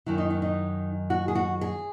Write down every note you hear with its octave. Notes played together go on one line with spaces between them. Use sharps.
F#2 D#3 F#3 E4
D#4
C#4
D#4
F#4
G#4
F#4
G#4